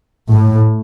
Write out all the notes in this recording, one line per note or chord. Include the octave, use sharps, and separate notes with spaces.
A2